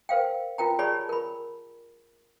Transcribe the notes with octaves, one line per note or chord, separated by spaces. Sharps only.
A#4 C5 F5 G5
F4 A#4 G5 A#5
G4 G#4 C#5 D5 A5 B5
A#4 B5